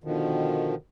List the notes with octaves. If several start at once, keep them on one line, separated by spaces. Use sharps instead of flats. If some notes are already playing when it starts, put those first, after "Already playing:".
B2 D3 D#3 F3